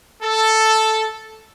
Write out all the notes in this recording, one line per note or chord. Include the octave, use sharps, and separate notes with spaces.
A4